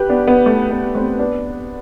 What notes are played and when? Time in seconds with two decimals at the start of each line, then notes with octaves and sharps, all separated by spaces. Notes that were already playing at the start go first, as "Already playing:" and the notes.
Already playing: G4 B4
0.09 B3 D4
0.27 B3
0.46 A3
0.71 B3
0.95 A3 C4
1.19 B3 D4